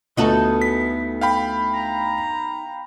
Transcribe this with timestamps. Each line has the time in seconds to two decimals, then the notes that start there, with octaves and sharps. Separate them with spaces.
0.17 D2 B3 D#4 F4 F#4 A4
0.62 B6
1.21 F5 G5 B5
1.74 A#5